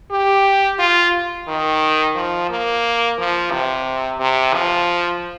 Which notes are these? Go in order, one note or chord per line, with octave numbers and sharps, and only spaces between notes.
G4
F4
D#3
F3
A#3
F3
C3
C3
F3